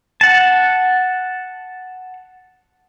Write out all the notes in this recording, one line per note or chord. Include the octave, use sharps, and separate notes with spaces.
F#5 A5